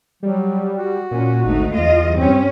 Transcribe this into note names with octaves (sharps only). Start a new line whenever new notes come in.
F#3 G3
F#4
A#2 C#4
G#1 D2 A3 D#4
E2 F4 D#5
G2 G3 C4 C#4